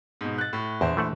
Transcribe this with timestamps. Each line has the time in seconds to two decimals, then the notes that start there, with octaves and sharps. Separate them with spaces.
0.21 G#2 B2
0.38 F#6 A6
0.53 A2
0.81 A#1 E2 C5
0.97 E3 A3 F#5